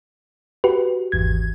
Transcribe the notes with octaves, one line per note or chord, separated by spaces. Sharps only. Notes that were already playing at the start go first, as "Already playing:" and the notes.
F#4 G4 B4
G#1 E2 G#6